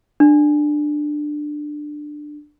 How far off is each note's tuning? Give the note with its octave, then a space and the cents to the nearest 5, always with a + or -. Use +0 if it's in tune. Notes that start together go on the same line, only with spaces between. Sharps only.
D4 +15